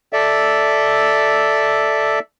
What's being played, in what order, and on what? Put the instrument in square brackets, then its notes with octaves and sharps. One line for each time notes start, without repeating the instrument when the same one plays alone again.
[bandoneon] A4 D5 E5